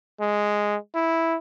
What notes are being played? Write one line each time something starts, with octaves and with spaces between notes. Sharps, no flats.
G#3
E4